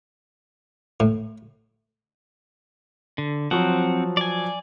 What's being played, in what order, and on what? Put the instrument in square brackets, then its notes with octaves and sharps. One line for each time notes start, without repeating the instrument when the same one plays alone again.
[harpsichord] A2
[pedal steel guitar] D3
[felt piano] F3 F#3 [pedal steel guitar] C4 F#5
[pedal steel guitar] D5 G#5